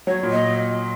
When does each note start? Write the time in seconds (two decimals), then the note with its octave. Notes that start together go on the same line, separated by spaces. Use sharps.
0.07 F#3 C#5
0.23 A#2
0.32 D#5